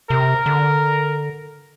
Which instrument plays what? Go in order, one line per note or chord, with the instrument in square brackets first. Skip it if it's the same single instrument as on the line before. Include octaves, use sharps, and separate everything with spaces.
[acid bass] C3 [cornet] A#4
[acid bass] D3